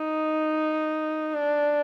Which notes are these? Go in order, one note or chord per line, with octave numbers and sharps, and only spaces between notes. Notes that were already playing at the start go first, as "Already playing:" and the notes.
Already playing: D#4
D4